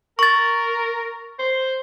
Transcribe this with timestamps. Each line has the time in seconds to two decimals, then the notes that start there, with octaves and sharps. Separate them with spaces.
0.19 A#4 C#6 A6
1.39 C5